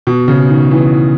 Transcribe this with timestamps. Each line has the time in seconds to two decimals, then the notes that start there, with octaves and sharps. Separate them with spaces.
0.07 B2
0.28 C#3
0.50 D#3
0.71 E3